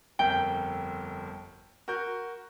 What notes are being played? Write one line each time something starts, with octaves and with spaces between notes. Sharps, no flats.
G1 F2 A#4 G5
F#4 A#4 G6